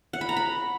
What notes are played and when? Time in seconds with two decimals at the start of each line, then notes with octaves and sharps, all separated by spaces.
0.13 F#5
0.21 B5
0.29 A#5
0.37 B5